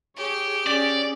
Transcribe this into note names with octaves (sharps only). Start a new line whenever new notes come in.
G4 G#4 C#5
C#4 G#4 D5